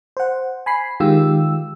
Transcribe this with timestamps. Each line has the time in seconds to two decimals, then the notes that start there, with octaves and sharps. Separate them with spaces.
0.17 C5 F#5
0.66 G#5 B5 C7
1.00 D#3 G#3 F4 G4 E6